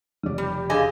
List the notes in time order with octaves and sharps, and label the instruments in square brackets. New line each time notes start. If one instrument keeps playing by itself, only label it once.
[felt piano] F1 D5 [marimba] C#3
[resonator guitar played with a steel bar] G3 [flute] G4
[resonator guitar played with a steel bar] D3 D#5 G#5 [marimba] G#4 F5